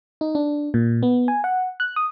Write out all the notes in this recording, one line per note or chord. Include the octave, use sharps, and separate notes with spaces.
D#4
D4
A#2
B3
G#5
F#5
F#6
D#6